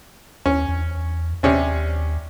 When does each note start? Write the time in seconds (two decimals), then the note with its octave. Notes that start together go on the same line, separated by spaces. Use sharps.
0.46 D#2 C#4
0.68 E2
1.43 D#2 C3 C#4 D4